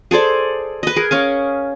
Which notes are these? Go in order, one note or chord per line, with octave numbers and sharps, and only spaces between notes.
G#4 A4 C5 D5
B4 D#5
G#4 A#4
C#4 F5 G#5